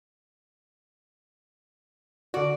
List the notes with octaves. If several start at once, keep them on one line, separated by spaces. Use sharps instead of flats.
D3 F#4 D5